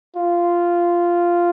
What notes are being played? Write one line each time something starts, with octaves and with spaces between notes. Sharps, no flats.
F4